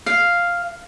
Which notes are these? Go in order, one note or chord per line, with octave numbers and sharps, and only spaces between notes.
F5